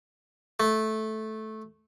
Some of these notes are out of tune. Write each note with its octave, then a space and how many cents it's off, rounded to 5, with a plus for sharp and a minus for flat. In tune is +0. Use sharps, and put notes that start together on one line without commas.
A3 -10